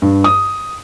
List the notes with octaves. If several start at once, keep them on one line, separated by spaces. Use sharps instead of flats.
G2
D#6